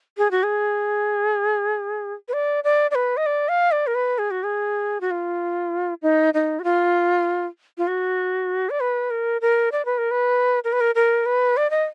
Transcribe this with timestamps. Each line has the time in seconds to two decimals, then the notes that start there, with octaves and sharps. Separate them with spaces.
0.18 G#4
0.31 F#4
0.43 G#4
2.28 B4
2.33 D5
2.64 D5
2.91 D5
2.95 B4
3.17 D#5
3.26 D5
3.49 F5
3.72 D5
3.87 A#4
3.95 B4
4.18 G#4
4.31 F#4
4.43 G#4
5.01 F#4
5.11 F4
6.02 D#4
6.34 D#4
6.59 F#4
6.64 F4
7.78 F4
7.88 F#4
8.70 D5
8.80 B4
9.10 A#4
9.41 A#4
9.72 D5
9.85 B4
9.98 A#4
10.11 B4
10.64 A#4
10.72 B4
10.80 A#4
10.95 A#4
11.26 B4
11.57 D5
11.70 D#5